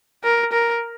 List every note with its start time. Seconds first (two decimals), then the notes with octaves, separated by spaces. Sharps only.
0.24 A#4
0.52 A#4